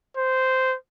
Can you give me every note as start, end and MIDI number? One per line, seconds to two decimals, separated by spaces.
0.17 0.76 72